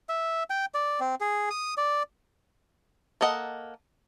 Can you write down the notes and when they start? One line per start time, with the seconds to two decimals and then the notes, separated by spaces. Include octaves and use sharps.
0.09 E5
0.50 G5
0.74 D5
1.00 C4
1.21 G#4
1.50 D#6
1.78 D5
3.21 A#3 A4 D#5 F#5